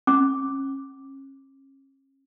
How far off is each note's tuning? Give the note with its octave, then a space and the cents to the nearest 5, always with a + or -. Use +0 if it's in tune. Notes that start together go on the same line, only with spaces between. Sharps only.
C#4 -35 D6 +0